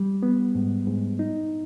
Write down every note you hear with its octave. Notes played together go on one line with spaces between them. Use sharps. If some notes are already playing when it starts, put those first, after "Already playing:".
Already playing: G3
B3
G#2
G#2
D#4